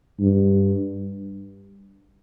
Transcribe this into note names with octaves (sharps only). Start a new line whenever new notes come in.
G2